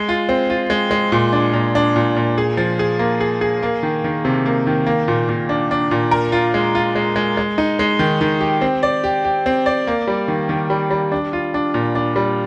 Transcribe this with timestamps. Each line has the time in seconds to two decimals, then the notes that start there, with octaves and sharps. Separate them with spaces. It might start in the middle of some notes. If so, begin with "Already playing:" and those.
Already playing: G#3
0.09 F4
0.29 C4
0.50 F4
0.70 G#3
0.91 G#3
1.12 A#2
1.33 D4
1.53 A#2
1.75 D4
1.96 A#2
2.16 A#2
2.38 G#4
2.57 F3
2.79 G#4
2.99 A#3
3.21 G#4
3.41 G#4
3.63 A#3
3.83 D#3
4.04 D#3
4.25 C3
4.46 A#3
4.67 D#3
4.86 A#3
5.08 A#2
5.29 A#2
5.49 D4
5.71 D4
5.91 A#2
6.11 A#4
6.32 F4
6.54 G#3
6.75 F4
6.95 G#3
7.16 G#3
7.37 G#3
7.58 D#4
7.79 G#3
7.99 D#3
8.21 D#3
8.41 G4
8.61 C4
8.83 D5
9.04 G4
9.25 G4
9.46 C4
9.66 D5
9.87 A#3
10.07 G3
10.28 D#3
10.49 D#3
10.70 G3
10.91 G3
11.12 D4
11.33 F4
11.54 D4
11.74 A#2
11.95 D4
12.16 G3